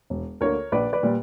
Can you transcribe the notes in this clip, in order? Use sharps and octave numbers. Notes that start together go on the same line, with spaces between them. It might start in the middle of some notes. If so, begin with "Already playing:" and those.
E1
D2 D3 A#3 A#4 C#5
A#1 B4 D5
B4 D5
A#2 G3